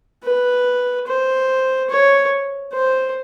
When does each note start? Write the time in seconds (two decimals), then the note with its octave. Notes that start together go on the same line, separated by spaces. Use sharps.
0.24 B4
1.07 C5
1.90 C#5
2.73 C5